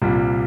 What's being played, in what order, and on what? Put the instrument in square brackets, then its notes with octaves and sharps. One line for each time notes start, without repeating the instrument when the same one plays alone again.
[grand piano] C2 A#2 G3